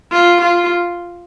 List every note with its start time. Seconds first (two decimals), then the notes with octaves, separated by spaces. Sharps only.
0.12 F4
0.41 F4